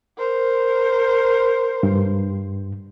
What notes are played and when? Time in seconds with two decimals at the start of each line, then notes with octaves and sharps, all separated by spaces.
0.18 A#4 C5
1.83 G2